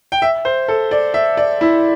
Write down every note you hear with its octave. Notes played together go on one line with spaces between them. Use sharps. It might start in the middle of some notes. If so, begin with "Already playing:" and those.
G5
E5
C5
A4
D5
E5
D5
E4